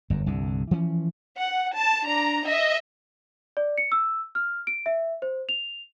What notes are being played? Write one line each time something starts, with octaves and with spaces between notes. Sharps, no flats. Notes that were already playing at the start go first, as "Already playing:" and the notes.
G1 F#2
C2 G2 D3
E3 F3 C#4
F#5
A5
D4 A#5
D#5 E5
D5
C#7
E6
F6
D7
E5
C5
F7